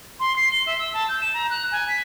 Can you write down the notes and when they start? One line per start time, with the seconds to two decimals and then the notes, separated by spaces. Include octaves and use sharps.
0.20 C6
0.36 C7
0.52 G7
0.66 E5
0.79 E6
0.94 A5
1.09 G6
1.21 E7
1.34 A#5
1.50 F#6
1.72 G#5
1.88 B6